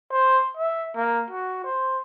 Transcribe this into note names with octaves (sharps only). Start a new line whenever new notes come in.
C5
E5
A#3
F#4
C5